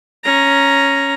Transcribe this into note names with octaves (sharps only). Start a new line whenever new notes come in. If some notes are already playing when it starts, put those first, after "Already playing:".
C#4 A#5